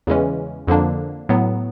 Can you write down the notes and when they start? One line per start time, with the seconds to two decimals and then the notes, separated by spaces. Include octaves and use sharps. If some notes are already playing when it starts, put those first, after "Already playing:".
0.07 E2 C#3 E3 G#3 C#4
0.67 F2 D3 F3 A#3 D4
1.29 A2 F#3 B3